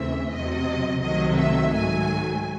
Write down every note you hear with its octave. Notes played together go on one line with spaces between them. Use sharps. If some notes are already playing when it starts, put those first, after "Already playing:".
Already playing: D#2 C#3 E3 A3 C4 E5
E2 C3 F#3 D#5
C2 C3 D#3 F#3 A3 D#5
E5
G#2 D#3 F#3 A3 G#5